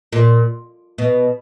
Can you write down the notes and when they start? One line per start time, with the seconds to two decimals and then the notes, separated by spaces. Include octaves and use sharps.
0.12 A#2
0.98 B2